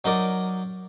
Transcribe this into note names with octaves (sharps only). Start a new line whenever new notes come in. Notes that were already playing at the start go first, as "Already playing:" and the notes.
F#3 D#4 A#4 D5